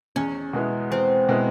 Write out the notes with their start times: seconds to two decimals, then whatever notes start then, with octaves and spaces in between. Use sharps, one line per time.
0.16 E2 C#4
0.53 B2 G#3 B3 E4
0.91 E2 C4
1.29 B2 G#3 B3 E4